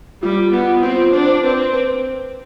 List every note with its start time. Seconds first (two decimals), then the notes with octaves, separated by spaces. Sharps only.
0.23 G3 F4
0.53 B3 F4
0.82 C4 F4
1.13 D4 C5
1.44 C4 B4
1.73 B4